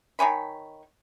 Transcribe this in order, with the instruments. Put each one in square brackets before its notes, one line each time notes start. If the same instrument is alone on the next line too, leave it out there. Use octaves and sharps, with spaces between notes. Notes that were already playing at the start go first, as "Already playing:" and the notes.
[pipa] D#3 C#5 G#5 B5